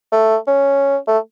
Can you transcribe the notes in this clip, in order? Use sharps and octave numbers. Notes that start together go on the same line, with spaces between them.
A3
C#4
A3